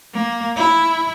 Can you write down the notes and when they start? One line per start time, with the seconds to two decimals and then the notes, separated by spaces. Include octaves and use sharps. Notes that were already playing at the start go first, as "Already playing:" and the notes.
0.13 A#3
0.56 E4